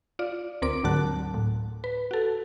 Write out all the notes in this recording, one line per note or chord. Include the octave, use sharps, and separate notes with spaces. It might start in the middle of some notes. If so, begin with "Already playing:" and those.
F4 D5
D2 C4 A#4 D6 D7
D2 G#2 D3 F#3 A5 F#6
A2
B4
F#4 A4